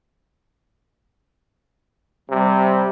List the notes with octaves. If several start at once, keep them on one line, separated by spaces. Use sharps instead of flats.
C3 G3